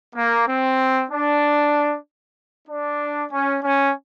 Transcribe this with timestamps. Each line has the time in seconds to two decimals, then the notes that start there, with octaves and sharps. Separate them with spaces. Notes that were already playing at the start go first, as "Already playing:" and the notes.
0.15 A#3
0.47 C4
1.10 D4
2.68 D4
3.32 C#4
3.63 C#4